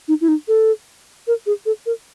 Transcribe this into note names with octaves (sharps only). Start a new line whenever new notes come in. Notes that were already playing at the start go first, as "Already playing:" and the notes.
D#4
E4
D#4
A4
A#4
G#4
A4
A#4